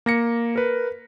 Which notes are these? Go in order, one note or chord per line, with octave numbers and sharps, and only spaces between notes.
A#3 A#6 C#7
A#4 B4